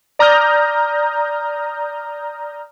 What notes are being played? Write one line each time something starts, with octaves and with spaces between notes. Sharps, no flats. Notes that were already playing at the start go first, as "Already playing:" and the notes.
D5 A#5 D#6 F6 G6 A#6